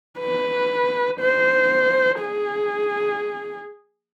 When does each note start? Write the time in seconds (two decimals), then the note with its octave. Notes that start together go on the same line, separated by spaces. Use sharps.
0.19 B4
1.21 C5
2.21 G#4